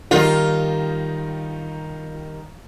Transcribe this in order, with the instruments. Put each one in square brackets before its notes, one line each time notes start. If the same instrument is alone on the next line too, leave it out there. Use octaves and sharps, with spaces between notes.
[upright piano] D#3 G3 D#4 [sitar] F4